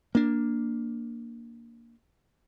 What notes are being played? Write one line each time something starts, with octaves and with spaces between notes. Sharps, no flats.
A#3 D4